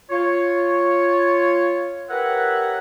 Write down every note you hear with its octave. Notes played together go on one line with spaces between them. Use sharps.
F4 C#5
G4 A#4 B4 C#5 E5 F#5